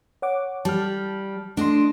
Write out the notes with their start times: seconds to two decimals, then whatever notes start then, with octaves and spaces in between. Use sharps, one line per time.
0.22 C#5 F#5 D6
0.65 G3 A5 F6
1.57 A3 D4 D#5 C6